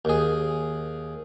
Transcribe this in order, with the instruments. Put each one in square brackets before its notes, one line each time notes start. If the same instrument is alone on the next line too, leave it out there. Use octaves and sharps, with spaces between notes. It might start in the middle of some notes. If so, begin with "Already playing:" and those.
[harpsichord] D#2 G#4